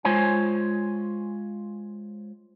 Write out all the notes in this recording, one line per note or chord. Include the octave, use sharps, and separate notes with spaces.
G#3 F4 C5 C#5 G#5